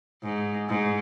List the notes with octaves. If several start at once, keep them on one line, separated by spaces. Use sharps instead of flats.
G#2
G#2